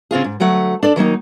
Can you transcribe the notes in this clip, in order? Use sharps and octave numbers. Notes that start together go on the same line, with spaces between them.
C#3 C4 F4 G#4
G#2
D2 F#3 A3 F#5
D4 A4 D5
D#3 F#3 A#3 D#4